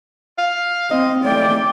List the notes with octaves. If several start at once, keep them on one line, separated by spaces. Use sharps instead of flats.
F5
C4 D#5
A3 D5 G5